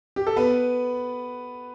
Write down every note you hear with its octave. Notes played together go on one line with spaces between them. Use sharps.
G4
A4
B3 B4